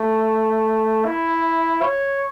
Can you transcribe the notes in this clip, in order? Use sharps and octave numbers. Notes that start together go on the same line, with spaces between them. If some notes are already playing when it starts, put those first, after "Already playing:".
Already playing: A3
E4
C#5